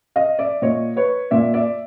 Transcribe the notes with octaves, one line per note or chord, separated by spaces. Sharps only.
D#5 F5
D5 E5
A#2 C#5 D#5
B4 C#5
A#2 D5 E5
D5 E5